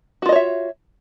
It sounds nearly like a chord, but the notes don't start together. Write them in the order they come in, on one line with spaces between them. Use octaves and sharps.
F#4 F4 D#5 C#5 E5